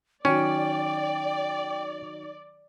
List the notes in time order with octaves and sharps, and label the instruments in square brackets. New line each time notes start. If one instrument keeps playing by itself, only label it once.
[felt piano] D#3 F#3 [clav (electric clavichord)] C#4 [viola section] D5 [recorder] G5